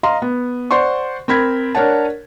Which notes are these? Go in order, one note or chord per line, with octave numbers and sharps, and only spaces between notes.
D#5 F5 A#5 C6
B3
C5 D5 F#5 C6 C#6
C4 A#4 B5 G#6 B6
D4 A#4 C#5 F#5 A5